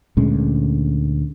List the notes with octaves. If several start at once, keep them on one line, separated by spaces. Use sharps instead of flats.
D2 A#2 G#3 C#4